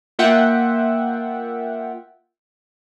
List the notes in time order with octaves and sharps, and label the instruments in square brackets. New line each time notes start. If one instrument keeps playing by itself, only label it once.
[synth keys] A#3 F4 E5 F#5 G5